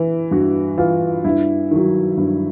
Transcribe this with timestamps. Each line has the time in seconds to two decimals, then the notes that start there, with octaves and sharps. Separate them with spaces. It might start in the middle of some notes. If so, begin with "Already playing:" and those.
Already playing: E3
0.31 G2 F#4
0.78 E3 F4
1.24 G2 E4
1.71 D#3 F#3
2.17 G2